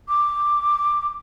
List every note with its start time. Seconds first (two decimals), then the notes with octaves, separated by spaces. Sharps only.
0.08 D6